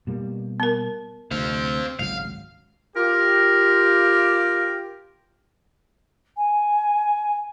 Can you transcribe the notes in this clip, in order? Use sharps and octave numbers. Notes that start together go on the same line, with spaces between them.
B2 G3 A#3
B3 A#4
D2 C3 C4 F5
G#1 C#2 F#3 F5
F4 G4 A#4
G#5